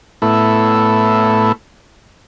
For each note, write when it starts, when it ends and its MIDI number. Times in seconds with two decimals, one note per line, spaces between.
0.22 1.52 45
0.22 1.52 57
0.22 1.52 59
0.22 1.52 64